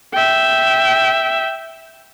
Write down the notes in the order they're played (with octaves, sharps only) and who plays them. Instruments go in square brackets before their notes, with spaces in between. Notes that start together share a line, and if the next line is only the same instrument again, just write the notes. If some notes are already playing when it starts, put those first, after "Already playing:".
[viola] E5 G5